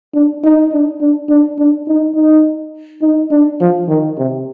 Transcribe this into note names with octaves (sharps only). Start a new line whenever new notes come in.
D4
D#4
D4
D4
D4
D4
D#4
D#4
D#4
D4
F3
D#3
C3